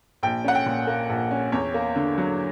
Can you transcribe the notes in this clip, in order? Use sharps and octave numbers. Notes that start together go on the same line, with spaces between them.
A#1 G5
C#4 F#5
G5
A#2
A#3
A#1
C#4
E2 C#5
A#3
D3
F#3